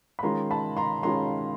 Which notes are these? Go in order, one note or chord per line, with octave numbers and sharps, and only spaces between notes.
B5
D#3 G#3 C#4 F4 A#5 C6
A5 B5
A#5 C6
D#3 G#3 C#4 F4 A#5 C6